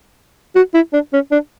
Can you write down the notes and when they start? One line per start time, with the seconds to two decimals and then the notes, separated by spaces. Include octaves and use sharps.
0.56 F#4
0.74 E4
0.93 D4
1.13 C#4
1.32 D4